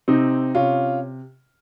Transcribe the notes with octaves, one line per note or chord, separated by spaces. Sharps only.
C3 C4 D#4
C3 C#4 F4